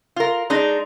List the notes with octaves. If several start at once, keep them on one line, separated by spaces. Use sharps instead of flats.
F4 A#4
G#3 D4 D#4